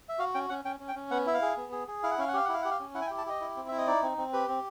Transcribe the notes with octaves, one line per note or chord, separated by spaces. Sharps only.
E5
F#4 F5
C#4 G5
C#4 F#5
C#4 G5
C#4
G5
C#4
B3 F#5
E4 E5
F5
G#4
B3
G#4
G#4
E4 F5
F#5
C#4 F5
F#5
G4 F5
E4 F#5
F5
G4 F#5
F5
C#4
E4 F#5
G#5
G5
G4
A5
G4 D#5
E4
C4
E4 E5
D#5
D#4 D5
C4
C4
G4 B4
C4